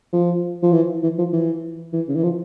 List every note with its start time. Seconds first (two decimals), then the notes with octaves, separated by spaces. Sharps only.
0.13 F3
0.63 F3
0.72 E3
1.03 E3
1.18 F3
1.33 E3
1.93 E3
2.08 C#3
2.15 E3
2.24 F3